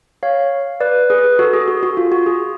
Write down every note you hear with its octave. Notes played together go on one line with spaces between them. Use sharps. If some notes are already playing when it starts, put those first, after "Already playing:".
C#5 F5
B4 D5
G#4 B4
F#4 A4
G#4
F#4
F#4
F4
F#4
G#4